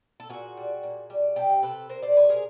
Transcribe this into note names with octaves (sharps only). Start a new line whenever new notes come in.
A4
A#2 F#4 G#4
G3
A#2
G3
C3 G4 A4
C3 A4 B4
C3 A#4 C5
C5 D5
C3 B4 C#5
G#4 A#4